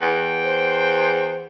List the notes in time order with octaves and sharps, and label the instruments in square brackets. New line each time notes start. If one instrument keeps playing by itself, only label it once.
[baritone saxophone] E2 [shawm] G5
[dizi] C5